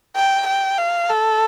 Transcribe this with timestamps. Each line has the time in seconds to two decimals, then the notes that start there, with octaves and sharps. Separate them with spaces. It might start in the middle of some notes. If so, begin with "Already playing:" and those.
0.16 G5
0.47 G5
0.78 F5
1.09 A4